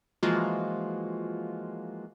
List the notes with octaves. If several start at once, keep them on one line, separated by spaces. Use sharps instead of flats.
E3 F3 G#3 A#3 F4 F#4